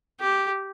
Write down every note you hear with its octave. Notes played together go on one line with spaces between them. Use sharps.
G4